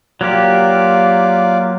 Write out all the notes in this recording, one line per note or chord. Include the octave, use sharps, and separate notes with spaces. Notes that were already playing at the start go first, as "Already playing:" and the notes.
F#3 A#3 F4 G4 D5